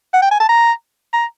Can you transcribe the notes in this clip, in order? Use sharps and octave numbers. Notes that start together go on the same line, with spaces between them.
F#5
G5
G#5
A5
A#5
A#5